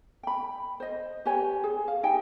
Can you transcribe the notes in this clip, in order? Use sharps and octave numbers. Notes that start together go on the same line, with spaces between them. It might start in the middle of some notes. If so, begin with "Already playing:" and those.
G5 B5
C5 D#5
G4 B4 C#5 G#5
G#4
F5
D#4 G4 G5 G#5